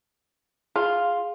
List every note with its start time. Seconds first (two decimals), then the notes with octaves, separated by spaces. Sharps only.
0.76 F4 G#4